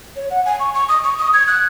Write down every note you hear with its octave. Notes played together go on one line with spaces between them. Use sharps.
C#5
F#5
G#5
C#6
C#6
D#6
C#6
D#6
G#6
F#6